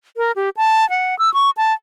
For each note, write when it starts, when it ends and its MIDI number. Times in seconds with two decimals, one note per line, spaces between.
0.17 0.32 70
0.36 0.50 67
0.57 0.88 81
0.90 1.18 78
1.19 1.33 88
1.34 1.50 85
1.57 1.73 81